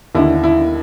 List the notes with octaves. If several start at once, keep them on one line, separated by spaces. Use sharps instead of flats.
D#2 D3 E4
E4